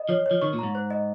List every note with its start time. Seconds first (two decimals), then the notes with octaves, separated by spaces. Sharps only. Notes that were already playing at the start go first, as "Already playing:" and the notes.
Already playing: D#5
0.09 F3 C#5
0.26 C#5
0.31 F3
0.42 D#3 C#6
0.53 A#2
0.59 G#2 A#5
0.75 C5
0.91 D#5